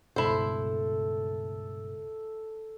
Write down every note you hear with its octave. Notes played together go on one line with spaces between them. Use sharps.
C#2 G2 B2 E4 A4 C5